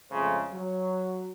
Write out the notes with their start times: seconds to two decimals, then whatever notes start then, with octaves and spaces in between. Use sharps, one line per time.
0.12 F2 C#3 G#3 A3 C#4 C5
0.51 F#3